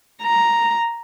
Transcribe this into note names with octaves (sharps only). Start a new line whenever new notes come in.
A#5